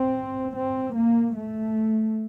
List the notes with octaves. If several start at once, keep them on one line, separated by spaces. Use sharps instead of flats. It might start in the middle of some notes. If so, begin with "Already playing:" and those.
Already playing: C4
C4
A#3
A3